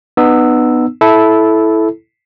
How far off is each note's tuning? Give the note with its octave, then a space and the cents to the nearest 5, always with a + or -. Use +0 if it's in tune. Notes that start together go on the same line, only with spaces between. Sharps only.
B3 +0 D#4 -35 E6 +0
E4 +0 A4 -15